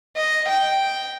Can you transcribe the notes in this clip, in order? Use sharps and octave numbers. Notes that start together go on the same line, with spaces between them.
D#5
G5